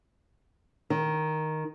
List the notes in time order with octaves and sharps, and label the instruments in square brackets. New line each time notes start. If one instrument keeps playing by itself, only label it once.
[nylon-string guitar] D#3